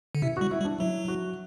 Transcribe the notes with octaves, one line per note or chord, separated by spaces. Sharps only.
D3
C3 E4
G3 F#4
E4
G3
D4
F#3 E4
F#4